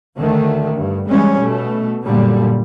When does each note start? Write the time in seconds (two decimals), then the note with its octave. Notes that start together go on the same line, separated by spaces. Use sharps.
0.19 D2 D3 D#3 A3
0.75 G2
1.09 E3 G3 G#3 C#4
1.42 B2 A3
2.04 F#2 A#2 D3 G3